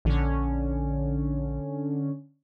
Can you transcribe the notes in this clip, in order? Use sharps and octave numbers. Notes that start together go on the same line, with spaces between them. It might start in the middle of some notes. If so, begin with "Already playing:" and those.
A#1 D3 C#4